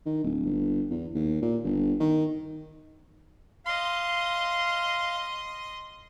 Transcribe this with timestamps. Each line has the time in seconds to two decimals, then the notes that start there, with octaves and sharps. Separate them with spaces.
0.06 D#3
0.23 D1
0.45 G1
0.90 E2
1.14 D#2
1.42 A#2
1.64 G1
2.00 D#3
3.66 D#5 F5 C6